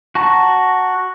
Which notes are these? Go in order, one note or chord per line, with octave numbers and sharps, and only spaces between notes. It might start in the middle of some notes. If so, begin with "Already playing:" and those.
F#4 A5 A#5 C#6